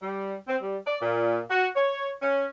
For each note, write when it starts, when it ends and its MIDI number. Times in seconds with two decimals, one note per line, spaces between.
0.02 0.34 55
0.48 0.57 60
0.62 0.77 55
0.87 0.97 74
1.02 1.39 46
1.50 1.68 66
1.76 2.10 73
2.22 2.45 61